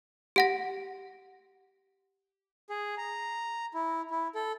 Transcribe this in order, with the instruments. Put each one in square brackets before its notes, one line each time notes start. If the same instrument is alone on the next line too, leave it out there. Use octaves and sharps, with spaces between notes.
[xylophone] G4 F#5 A#6
[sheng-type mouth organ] G#4
A#5
E4
E4
A4